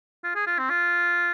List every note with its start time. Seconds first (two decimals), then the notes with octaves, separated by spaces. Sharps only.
0.24 F4
0.35 G#4
0.47 F4
0.58 C4
0.70 F4